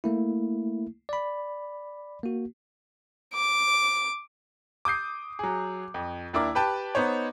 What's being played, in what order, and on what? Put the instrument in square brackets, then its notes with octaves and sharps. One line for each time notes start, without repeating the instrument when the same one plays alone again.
[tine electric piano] A3 A#3 E4
D5 B5
A#3 F#4
[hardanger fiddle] D6
[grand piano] D6 D#6 G6 C7
F#3 G#4
F2
D#2 D4 E4 A#4 D6
G4 B4 G5 A5
B3 D#4 C5 C#5